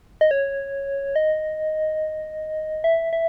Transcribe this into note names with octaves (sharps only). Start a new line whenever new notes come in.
D#5
C#5
D#5
E5
E5